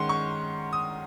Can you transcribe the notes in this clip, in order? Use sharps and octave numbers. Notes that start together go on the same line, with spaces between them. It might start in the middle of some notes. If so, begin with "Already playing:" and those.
Already playing: D#3 G#3 C#4 F#5 C6
C#6
D#6